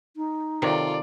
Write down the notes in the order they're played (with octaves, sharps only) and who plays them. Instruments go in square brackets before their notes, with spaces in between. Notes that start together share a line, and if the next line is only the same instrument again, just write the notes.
[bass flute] D#4
[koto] C3 D#3 F#3 [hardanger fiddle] F4 A4 [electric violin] D5